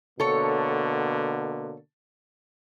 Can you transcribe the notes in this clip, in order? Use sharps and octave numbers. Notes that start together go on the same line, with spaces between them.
B2 D3 A#3 A4 C#5